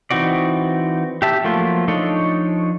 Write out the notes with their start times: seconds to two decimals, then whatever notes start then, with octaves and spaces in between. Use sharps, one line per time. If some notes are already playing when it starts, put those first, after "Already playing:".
0.10 E3 C4 D#4 F#4 D5
1.22 G4 E5 A5
1.44 F3 F#3 A3 A#3 F4
1.88 F3 D4 D#4 A4 C#5